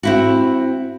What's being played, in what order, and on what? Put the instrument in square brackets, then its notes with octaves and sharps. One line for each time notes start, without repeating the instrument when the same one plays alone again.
[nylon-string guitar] C4 E4 F#4